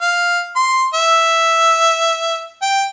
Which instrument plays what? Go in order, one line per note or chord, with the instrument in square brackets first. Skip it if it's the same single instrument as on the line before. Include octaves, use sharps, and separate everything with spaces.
[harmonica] F5
C6
E5
G5